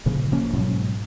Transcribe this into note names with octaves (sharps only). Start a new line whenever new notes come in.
G2 A#2 C#3 F3
F#1 F3 A#3 C#4
G#2 B2 F#3 G#3